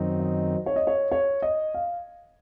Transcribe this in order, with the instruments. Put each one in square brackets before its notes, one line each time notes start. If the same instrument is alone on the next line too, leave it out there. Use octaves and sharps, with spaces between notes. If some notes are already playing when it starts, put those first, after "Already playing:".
Already playing: [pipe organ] F#2 D#3 F#3 C4 D#4
[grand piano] D#5
C#5
D#5
C#5
C#5
D#5
F5